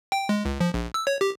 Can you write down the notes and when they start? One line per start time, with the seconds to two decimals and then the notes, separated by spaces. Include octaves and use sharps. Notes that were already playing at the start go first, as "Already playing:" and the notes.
0.12 G5
0.29 G#3
0.45 C#2
0.61 F3
0.74 A#1
0.94 E6
1.07 C#5
1.21 G4